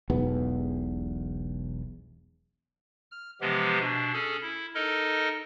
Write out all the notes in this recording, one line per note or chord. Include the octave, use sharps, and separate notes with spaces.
E1 B1 E2 B3
F6
C3 E3 F3 G#3 B3 G4
B2 D4
C#4 G#4 A4
E4
D#4 A4 A#4 D#5